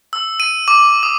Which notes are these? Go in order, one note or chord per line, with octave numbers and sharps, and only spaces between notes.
E6
D#7
D6
D#6